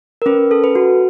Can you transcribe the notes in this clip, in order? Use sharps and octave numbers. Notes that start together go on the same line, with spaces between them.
A#4
C#4 B4
A4
B4
F#4